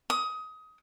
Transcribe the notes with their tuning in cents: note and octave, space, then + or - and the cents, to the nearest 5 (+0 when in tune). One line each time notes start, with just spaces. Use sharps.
D#6 +20